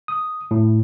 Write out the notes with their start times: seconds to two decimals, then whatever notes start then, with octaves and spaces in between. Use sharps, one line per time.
0.08 D#6
0.51 A2